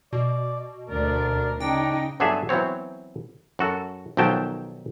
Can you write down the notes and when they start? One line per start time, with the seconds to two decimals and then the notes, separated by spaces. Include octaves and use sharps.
0.12 B2 D5
0.89 D2 D4 A#4 D5
1.60 C#3 D4 D#4 G5
2.20 G1 D3 F#3 G#4 A4 E5
2.49 E3 F#3 B3 C4 C#5
3.59 F#2 F#4 A4
4.17 B1 D#3 F3 F#3 G5 A5